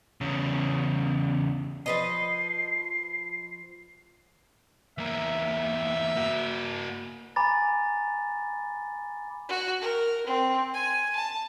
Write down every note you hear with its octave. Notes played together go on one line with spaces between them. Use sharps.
E2 C#3
F3 B4 D#5 C7
E2 A#3 E5
A#3 F#4
G#5 A#5 B5 D6 A6
F#4
A#4
C4
G#5
A5